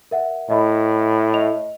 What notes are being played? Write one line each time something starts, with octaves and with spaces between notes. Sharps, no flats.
A#4 E5 F#5
A2 D#5 E5 B5
D#5 F7